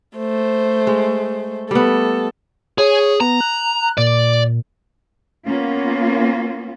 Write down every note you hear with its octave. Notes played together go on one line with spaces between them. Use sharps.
A3 C5
G#3
G3 A3 B3 A4
G#4 C#5
B3 A#5
F#6
A#2 D5
A#3 B3 C#4 F4